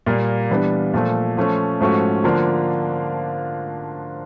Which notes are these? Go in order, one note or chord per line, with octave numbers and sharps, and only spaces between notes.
A#2 G3 A#3
E3 G3 B3 D4
A#2 F3 A3
F3 A3 C#4
G#2 F3 A3 C#4 F#4
D3 F3 A#3 D4 F4